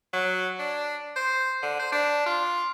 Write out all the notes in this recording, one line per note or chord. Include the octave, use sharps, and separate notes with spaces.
F#3
D4
C5
D3
C5
D4
F4